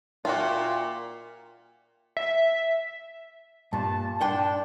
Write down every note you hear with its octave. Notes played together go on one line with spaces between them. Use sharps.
A#2 F4 F#4 E5 G5 D6
E5
G2 A#2 A5
D4 F#5 G5 C6